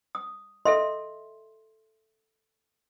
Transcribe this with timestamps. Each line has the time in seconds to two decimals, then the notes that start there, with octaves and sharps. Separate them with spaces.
0.15 D#6
0.65 A4 D#5 E5 C6